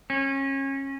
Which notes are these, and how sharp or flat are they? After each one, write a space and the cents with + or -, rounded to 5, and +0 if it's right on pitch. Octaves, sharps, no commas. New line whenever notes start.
C#4 -25